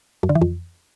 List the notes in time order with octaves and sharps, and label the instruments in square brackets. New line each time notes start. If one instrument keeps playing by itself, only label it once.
[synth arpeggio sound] F#2
D3
E3
F2